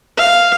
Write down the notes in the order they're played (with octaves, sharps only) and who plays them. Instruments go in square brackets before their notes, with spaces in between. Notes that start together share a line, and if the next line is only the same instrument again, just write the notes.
[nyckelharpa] F5